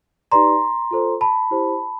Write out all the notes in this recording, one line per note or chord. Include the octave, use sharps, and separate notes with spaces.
D#4 G4 B4 D5 A#5 C6
F4 A4 C5
A5 B5
E4 G4 C5